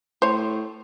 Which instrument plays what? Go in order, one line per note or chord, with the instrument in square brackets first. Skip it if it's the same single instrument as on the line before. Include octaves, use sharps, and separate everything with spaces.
[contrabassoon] A2 [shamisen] C5 C#5